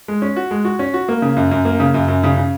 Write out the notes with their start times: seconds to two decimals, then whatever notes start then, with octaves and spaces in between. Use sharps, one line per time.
0.08 G#3
0.22 C#4
0.36 F#4
0.51 G#3
0.65 F#4
0.79 C#4
0.94 F#4
1.08 A#3
1.22 C#3
1.36 F#2
1.51 F#2
1.65 A#3
1.80 C#3
1.94 F#2
2.08 F#2
2.24 C#3
2.38 C#3